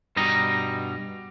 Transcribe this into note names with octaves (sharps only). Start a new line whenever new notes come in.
G2 B2 G3 D#5 A#5